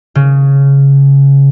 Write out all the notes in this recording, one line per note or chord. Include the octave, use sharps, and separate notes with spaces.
C#3